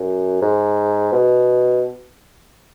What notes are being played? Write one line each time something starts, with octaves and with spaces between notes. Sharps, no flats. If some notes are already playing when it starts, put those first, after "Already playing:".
Already playing: F#2
G#2
B2